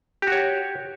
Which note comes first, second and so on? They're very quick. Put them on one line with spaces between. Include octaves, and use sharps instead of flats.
G4 F#4 C#5